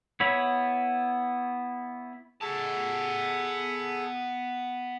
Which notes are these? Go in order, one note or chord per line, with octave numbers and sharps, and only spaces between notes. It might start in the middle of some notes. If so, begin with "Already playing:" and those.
B3 E4 C#5 B5
B3 G#4 A4 A5